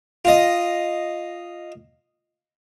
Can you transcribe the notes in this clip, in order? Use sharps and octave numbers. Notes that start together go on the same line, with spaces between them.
F4 D#5